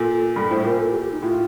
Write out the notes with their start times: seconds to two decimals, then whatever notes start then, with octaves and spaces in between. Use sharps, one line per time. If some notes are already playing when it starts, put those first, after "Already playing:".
Already playing: A#2 A4
0.36 G2 A4
0.50 A2 C5
0.64 A#2 A#4
0.80 A4
0.91 G4
1.01 G4
1.12 D#4
1.22 A2 F4